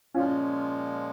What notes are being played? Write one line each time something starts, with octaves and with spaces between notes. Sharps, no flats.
A#2 F3 G#3 C#4 F4